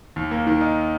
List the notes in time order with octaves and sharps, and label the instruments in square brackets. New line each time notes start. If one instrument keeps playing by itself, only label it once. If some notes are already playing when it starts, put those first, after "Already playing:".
[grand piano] D#2
A#3
D#3
D#4